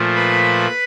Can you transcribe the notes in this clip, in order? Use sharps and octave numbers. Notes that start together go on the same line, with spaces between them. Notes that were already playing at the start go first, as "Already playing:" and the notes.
Already playing: A#2 F3 A3
B4 B5